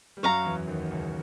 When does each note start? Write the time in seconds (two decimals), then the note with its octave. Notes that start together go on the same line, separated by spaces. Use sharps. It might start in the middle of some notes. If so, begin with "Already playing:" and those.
0.17 G3
0.23 F#2 F#3 C#5 F5 A#5
0.45 E2 E3
0.67 D#2 D#3
0.91 C#2 C#3